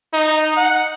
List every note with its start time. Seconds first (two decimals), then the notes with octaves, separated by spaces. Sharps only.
0.14 D#4
0.57 F#5